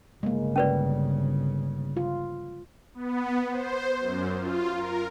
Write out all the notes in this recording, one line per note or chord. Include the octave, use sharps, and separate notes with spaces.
G1 C#3 G#3 A#3
C#4 B4 D5
F4
B3
C5
F#2
F4
A#4